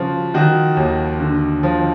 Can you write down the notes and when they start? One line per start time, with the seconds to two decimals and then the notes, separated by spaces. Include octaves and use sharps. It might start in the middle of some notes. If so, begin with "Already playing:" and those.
Already playing: C#3 F3 F#4
0.34 D#3 F#4
0.77 D#2
1.20 D3
1.63 F3